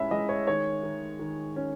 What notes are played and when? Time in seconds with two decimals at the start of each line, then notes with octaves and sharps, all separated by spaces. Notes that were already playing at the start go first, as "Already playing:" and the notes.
Already playing: A2 G#3 C#4 E5 B5
0.11 G#3 D#5
0.29 C#5
0.47 D#3 C#5
0.83 D#3
1.19 D#3
1.56 C#4